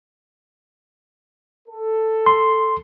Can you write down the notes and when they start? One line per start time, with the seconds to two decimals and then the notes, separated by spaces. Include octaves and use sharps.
1.69 A4
2.26 C6